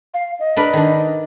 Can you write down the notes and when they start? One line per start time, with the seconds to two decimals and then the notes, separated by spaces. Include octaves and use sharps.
0.14 F5
0.40 D#5
0.57 D4 A#4 B4
0.73 D#3 D4